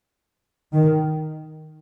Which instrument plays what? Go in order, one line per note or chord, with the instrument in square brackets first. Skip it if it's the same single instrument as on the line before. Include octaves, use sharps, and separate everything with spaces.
[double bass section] D#3